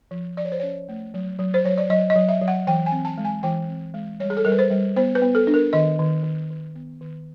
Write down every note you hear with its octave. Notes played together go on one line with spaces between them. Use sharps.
F3
F3 D5
C#5
C5
C#4 C#5
A3
F#3
F#3
C5
F#3 C#5
D5
F#3 D#5
D#5
F#3
E5
F#3
F#5
E3 G5
G#5
C4
A5
G#3
G#5
E3 G5
C4
G#3
G3 C#5
G#4
A4
G3 A#4
B4
C5
G3
B3 C5
B4
B3
A4
D4
A#4
D#3 D#5
D#3
D#3
D#3
B3
D#3